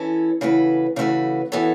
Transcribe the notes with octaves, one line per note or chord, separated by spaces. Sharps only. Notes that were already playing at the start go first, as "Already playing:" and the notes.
Already playing: E3 C#4 A4
C#3 E3 A3 F#4 B4
C#3 E3 A3 F#4 B4
E3 B3 F#4 A4 C#5